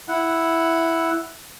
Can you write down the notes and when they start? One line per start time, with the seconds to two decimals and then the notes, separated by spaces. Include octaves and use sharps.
0.08 E4 F#5